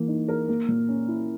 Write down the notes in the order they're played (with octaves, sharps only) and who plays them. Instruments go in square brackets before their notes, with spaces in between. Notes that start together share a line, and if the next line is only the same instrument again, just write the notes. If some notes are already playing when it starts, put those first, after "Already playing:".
Already playing: [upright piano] E3 A#3
D#4
A#4
A#3
A#2
C#4
E4